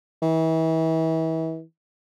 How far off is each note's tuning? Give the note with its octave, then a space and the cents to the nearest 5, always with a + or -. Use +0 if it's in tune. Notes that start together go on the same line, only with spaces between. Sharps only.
E3 -35